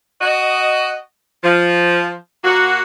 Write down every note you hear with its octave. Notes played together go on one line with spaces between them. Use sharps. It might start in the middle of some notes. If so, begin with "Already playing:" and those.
F#4 D#5
F3
A#2 A#3 F#4